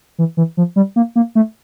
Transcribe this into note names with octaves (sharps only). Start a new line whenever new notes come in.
E3
E3
F3
G3
A#3
A#3
A3